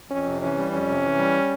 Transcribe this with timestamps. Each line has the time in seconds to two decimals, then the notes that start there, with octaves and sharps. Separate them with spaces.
0.10 F2 C#4
0.26 C3
0.42 E3 C#4
0.57 G3
0.72 F2 C#4
0.87 C3
1.03 E3
1.18 G3